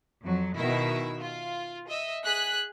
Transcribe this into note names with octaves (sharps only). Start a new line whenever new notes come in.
F2 F#3
B2 D#3 E4 E5
F4
D#5 E5
G#4 F#6 B6